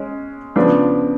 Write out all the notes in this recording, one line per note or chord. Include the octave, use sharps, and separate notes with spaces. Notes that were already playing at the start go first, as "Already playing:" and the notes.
Already playing: G#3 C#4
C#3 F3 B3 D4